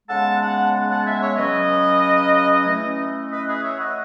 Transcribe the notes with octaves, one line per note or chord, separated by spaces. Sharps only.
C#3 G#3 B3 F#5 A5
F#5 A5
F#5 A5
E5 G#5
C#5 E5
C#3 F#3 C#4 B4 D#5
E3 A3 C#4
B4 D#5
G#4 B4
C#5 E5
D#5 F#5